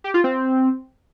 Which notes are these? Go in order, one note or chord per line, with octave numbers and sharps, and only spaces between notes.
G4
F4
C4